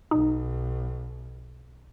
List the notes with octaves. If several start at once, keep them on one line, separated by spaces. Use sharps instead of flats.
B1 D#4